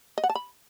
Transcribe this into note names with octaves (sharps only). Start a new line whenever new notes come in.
D#5
F#5
A5
B5